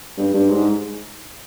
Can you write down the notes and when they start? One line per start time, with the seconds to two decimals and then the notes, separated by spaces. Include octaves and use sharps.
0.18 G2
0.34 G2
0.49 G#2